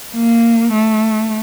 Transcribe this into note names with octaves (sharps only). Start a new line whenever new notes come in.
A#3
A3